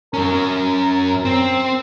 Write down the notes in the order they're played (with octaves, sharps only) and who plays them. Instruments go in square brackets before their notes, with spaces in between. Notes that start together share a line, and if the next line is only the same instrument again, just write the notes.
[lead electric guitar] F#2 C#4 [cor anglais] A#4
[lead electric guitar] C4